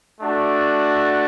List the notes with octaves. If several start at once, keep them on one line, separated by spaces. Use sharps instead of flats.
A3 D4 F#4